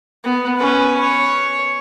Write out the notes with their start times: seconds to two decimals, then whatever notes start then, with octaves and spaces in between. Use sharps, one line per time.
0.24 B3
0.57 C#4 B4
1.01 C#5